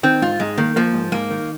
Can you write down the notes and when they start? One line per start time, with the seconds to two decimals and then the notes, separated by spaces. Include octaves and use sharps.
0.03 D#3 C4
0.22 G#2 F4
0.40 G#2 G#3
0.57 D#3 A#3
0.76 F3 A#3
0.94 G#2
1.12 G#2 A#3
1.30 D#3